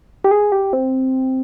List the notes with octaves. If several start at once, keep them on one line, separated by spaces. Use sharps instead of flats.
G4
G#4
G4
C4